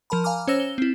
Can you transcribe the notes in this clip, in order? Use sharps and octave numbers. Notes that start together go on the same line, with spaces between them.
F3 A#4 A5 B5
F5 G#5 A#5 D6 F6
C#4 C5 C#5 E6 A#6 E7
G7
C4 E4